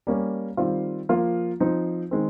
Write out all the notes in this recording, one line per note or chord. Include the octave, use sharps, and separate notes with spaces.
G3 A#3 C#4
D#3 G3 C4 F4
F3 A#3 F4
F3 C4 D#4
D#3 G#3 C4